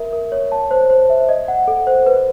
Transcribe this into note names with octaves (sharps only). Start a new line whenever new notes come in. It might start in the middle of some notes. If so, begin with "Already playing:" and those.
Already playing: A#4 E5
A#4
C#5
A5
C5
C5
E5
D#5
F#5
A4
C5
B4